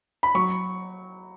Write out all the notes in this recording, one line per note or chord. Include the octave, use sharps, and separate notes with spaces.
B5
F#3 C#6